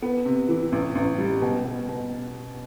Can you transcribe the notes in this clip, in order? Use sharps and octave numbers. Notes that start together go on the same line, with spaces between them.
B3
C3
E3
A1
A1
G3
B2
B2
B2